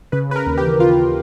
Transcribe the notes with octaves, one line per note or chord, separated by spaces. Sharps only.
C#3 B4
C#3 B4
A#4
D#2
G4
E3
D#2 F4